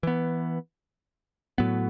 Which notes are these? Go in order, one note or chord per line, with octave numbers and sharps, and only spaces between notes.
E3 B3
A2 F#3 B3